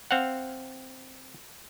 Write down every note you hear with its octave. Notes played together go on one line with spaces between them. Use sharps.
C4 F5 F#5